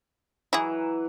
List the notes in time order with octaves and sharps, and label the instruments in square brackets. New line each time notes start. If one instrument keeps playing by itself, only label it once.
[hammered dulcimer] E3 F#3 [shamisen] E4 G#4